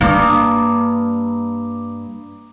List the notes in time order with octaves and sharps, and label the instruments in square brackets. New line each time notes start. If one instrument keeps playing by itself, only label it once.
[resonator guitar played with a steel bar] G2 [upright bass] A#3 [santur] A#5 D6 D#6